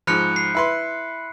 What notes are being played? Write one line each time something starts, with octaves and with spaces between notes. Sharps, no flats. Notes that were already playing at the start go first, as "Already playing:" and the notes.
G#2 F3 B5 F#6 C#7
C7
E4 B4 C6